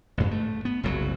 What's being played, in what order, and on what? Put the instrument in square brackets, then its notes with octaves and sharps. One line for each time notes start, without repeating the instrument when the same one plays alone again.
[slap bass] A1 G2
A3
B3
F#1 C2 C3 F#3